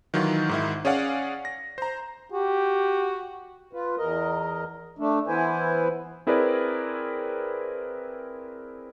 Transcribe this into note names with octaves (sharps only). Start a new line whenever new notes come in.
D#3 E3 F#3 D#4 F4
G#2 D#3 E4
C#4 G#4 C#5 D5 F5 F#5
A#6
C5 A#5
F#4 G4
F4 B4
E2 A#4 D#5
A3 D4
E3 B3 E4 B4 C5 G#5
C4 E4 G#4 A#4 B4 D5